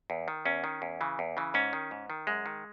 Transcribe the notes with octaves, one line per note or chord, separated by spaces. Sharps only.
E2
D#3
E2 C#4
D#3
E2
C#3 E3
E2
C#3 E3
G#2 C#4
D#3
G#2
D#3
F#2 G#3
D#3